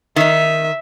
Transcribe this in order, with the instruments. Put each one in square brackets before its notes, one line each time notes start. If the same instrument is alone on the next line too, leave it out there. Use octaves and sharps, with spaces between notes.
[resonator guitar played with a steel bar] D#3 D#4 [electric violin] E5